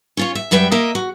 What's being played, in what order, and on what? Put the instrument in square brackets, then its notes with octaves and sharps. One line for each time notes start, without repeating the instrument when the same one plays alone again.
[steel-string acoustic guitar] C#4 F4 C#5
E5
F#2 G3 B4 E5 G5
A#3 A#4 D#5 E5
F#4